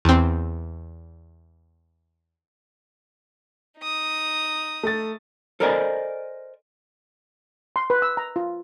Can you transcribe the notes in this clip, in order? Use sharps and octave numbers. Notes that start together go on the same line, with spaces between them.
E2 C4
D#4 D#6
A3 A6
A4 A#4 C5 D5 D#5 G#5
C6
B4
E6
A#5
F4